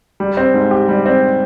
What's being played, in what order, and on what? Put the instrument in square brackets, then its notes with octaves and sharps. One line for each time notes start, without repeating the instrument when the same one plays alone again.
[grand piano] G3
C4
G#2
G4
G3
C4